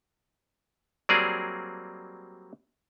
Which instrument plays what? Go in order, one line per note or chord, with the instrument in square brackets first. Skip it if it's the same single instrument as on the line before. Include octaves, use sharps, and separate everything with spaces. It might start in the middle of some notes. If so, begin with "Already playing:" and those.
[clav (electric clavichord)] F#3 G3 A#3 C4 G#4 D5